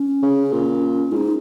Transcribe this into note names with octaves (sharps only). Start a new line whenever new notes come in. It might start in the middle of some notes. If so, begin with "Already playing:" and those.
Already playing: C#4
C#3
A#2
G#2 D#4 F4